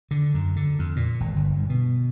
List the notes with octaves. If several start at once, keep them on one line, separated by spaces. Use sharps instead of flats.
D3
F#2
D3
F2
A#2
G#1
G1
G2
B2